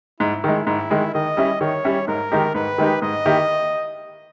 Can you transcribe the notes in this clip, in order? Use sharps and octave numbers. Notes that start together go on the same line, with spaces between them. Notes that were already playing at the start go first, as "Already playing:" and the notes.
G#2 E4
D#3 G#3
G#2 E4
D#3 G#3
D#3 D#5
G3 C#4 E4
D#3 C#5
G3 C#4 E4
G#2 A#4
D#3 G#3 D#4 G4
G#2 B4
D#3 G#3 D#4 G4
G#2 D#5
D#3 A#3 E4 G4